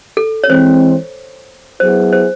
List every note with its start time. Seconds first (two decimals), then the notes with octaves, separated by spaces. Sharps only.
0.17 A4
0.44 C#5
0.49 E3 G#3 C4 C5
1.80 F#3 B3 E4 G#4 C5
2.13 C5